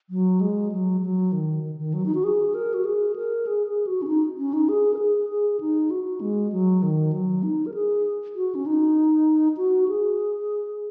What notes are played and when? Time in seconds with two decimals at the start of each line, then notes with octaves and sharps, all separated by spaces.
0.10 F#3
0.41 G#3
0.72 F#3
1.01 F#3
1.32 D#3
1.63 D#3
1.79 D#3
1.94 F#3
2.06 D#4
2.15 F#4
2.24 G#4
2.54 A#4
2.74 F#4
2.85 G#4
3.16 A#4
3.47 G#4
3.67 G#4
3.87 F#4
4.02 C#4
4.07 D#4
4.38 C#4
4.53 D#4
4.69 G#4
4.94 A#4
4.99 G#4
5.29 G#4
5.60 D#4
5.91 F#4
6.21 G#3
6.52 F#3
6.82 D#3
7.13 F#3
7.43 D#4
7.66 A#4
7.74 G#4
8.36 F#4
8.55 C#4
8.66 D#4
9.57 F#4
9.88 G#4